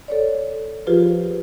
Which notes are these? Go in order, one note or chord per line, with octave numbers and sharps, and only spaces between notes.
A4 C#5 D5
F3 F4 G4 G#4 B4 C5